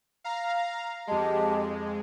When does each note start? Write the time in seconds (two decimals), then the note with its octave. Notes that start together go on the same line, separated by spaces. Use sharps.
0.24 F5 A#5
1.07 F2 G#3 G4 D#5 A5